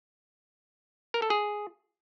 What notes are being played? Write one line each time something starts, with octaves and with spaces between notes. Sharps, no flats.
A#4
A4
G#4